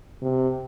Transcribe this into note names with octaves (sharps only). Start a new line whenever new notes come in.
C3